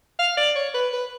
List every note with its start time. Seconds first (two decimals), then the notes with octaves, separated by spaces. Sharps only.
0.19 F5
0.37 D5
0.56 C#5
0.74 B4
0.93 B4